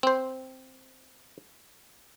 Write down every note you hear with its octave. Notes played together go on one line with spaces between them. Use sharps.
C4 C5